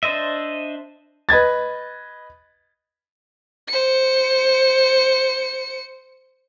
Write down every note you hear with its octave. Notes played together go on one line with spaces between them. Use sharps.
D4 C5 D#5 E5
B4 D#5 G#6 A6
C5 C#7